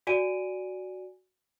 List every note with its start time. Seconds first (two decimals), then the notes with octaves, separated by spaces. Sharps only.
0.07 F#4 D5 G#5 D7 D#7